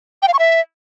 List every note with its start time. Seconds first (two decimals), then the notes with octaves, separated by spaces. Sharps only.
0.22 G5
0.28 F5
0.33 C#6
0.39 E5